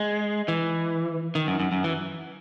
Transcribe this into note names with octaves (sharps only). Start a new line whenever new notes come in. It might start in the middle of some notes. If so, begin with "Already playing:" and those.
Already playing: G#3
E3
D#3
F#2
F#2
F#2
E3